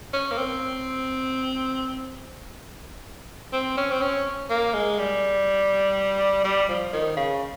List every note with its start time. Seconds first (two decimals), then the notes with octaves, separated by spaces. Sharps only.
0.13 C#4
0.31 A#3
0.37 C4
3.52 C4
3.77 C#4
3.91 C4
4.01 C#4
4.50 A#3
4.74 G#3
4.99 G3
6.44 G3
6.69 F3
6.93 D#3
7.17 C#3